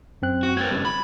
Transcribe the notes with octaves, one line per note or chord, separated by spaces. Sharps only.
F#2 C4 F#6
F#4
A#3 C4 G#6 A6
G2 C#3
B5